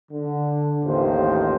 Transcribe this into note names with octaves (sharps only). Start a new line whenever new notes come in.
D3
A1 D#2 F4 C5